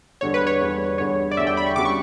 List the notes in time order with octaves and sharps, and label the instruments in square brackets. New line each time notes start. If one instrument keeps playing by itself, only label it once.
[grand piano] E2 D3 G3 [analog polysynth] C#5
[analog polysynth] B4
C#5
[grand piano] E2 D3 G3
[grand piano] E2 D3 G3 [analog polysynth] C#5
[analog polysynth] D5
[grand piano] E2 D3 G3 [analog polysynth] E5
[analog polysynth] G5
B5
C#6
[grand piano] C#3 G3 B3 D4 F#4 [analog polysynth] D6
[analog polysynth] C#6